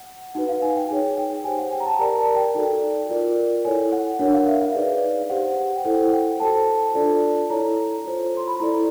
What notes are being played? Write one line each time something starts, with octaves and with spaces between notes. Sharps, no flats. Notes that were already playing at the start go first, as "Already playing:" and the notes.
Already playing: F#5
D#4 F#4 B4 F#5
F5
G#5
G5
D#4 G#4 C#5
G5
G4 C5 G#5
F#5
G5
A#5
A5
G4 A#4 D5 A#5
A5
G5
D#4 F#4 A4 D5
F4 A#4 D5
E4 A4 C#5 G#5
F#5
D4 F#4 A#4 C#5 F#5
F5
E5
F5
D#4 G#4 B4 D5
F5
G4 C5 F#5
G5
E4 A4 C5 F#5
G5
F#4 A4 C5 A5
D4 F4 A4 D5
E4 A4 C#5 A#5
F4 A4 C5
C6
B5
E4 A4 D5 A#5